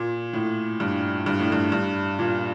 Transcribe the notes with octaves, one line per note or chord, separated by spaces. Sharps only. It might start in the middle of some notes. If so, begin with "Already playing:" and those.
Already playing: A#2
A2
G2
G2
A2
G2
G2
A#2